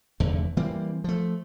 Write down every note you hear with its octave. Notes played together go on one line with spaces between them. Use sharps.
F1 E2 D3 A3
E3 G3 A#3 C4
F3 A3